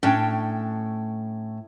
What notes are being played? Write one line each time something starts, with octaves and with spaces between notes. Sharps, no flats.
A2 C#4 D4 G5